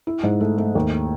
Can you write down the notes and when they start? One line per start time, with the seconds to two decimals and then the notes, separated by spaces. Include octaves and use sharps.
0.07 E4
0.23 G#2
0.40 A3
0.58 A3
0.75 D#2